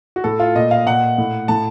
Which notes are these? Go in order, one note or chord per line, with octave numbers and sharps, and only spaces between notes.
F#4
A2 A4
F4
A#2 D#5
F5
A#2 F#5
A2
A2 A5